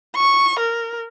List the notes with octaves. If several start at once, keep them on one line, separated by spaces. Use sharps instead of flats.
C#6
A#4